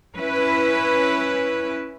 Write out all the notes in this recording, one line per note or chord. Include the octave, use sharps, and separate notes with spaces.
C#4 E4 B4